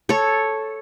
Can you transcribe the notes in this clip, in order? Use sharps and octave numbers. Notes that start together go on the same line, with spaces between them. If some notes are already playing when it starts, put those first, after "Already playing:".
A4 C#5